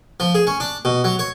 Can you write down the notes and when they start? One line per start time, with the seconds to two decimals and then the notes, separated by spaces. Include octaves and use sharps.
0.20 F3
0.35 G#4
0.47 C#4
0.60 D4
0.85 B2
1.04 F#3
1.19 C#5